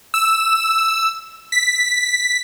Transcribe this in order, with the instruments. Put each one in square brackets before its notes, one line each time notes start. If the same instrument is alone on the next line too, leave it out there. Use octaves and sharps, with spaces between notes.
[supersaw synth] E6
B6